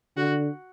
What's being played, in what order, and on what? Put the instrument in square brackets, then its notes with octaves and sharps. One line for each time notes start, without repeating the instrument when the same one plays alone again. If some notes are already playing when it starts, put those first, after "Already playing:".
[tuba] D3 [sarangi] F#4